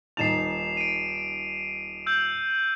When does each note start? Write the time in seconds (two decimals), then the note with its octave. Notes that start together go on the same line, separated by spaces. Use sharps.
0.17 D#1 D#4 A6 C7 E7 F7
0.77 D7 D#7
2.06 E6 G6